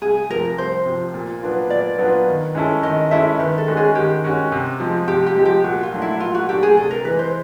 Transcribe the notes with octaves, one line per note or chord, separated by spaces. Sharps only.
C2 G#4
C3 F3 A#4
C2 C5
C3 F3
A#2
F#3 B3 D4 F4
A#2 D5
F#3 B3 D4 F4
D#3
G#3 C#4 E4 A4
D#3 D#5
G#3 C#4 E4 A4 E5
D#3 B4
A4
G#3 C#4 F#4
G#4
D#3 G4
G#3 C#4 F#4
C3
F3 G#3
C3 G4
G4
F3 G#3
G4
A#2 F#4
F4
F#3 A3 D4
E4
A#2 F4
F#4
F#3 A3 D4 G4
G#4
C3 A4
A#4
E3 G#3 B4
C5